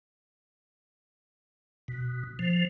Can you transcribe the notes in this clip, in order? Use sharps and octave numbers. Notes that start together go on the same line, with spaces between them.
B2
F3